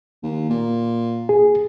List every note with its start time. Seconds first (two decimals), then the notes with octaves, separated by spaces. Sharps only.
0.23 D#2
0.50 A#2
1.29 G#4